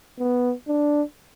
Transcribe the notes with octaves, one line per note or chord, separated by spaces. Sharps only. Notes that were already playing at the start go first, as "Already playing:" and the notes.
B3
D4